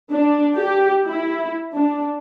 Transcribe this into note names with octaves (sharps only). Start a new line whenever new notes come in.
D4
G4
E4
D4